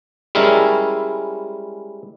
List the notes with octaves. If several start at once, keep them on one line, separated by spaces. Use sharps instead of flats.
G3 G#3 C#4 E4 A#4